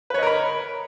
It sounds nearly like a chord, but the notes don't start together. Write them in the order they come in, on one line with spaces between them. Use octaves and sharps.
B4 C#5 D#5 A#4 B5